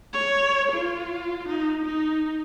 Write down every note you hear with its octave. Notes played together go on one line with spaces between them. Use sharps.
C#5
F4
D#4
D#4